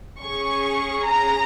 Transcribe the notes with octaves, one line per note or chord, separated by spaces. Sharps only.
C#4 G#4 C#6
A#5